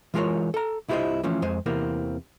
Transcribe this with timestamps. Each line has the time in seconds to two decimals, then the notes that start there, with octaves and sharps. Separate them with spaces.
0.14 E3 G#3 F4 G4 A#4 C#5
0.54 A4 A#5
0.88 C2 E4 F4 G4 C5 D#5
1.23 E3 F3 A3 C#4
1.42 F2 G#3 C5 G#5
1.66 E2 C3 E3 A#3 C4